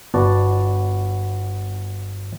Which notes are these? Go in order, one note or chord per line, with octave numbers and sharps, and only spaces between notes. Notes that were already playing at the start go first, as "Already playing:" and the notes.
G1 B3 F#4 D5 A5